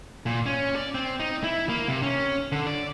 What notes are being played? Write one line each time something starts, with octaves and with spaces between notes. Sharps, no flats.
A#2
C#4
D5
C4
D#4
E4
A#3
C3
C#4
D3
D5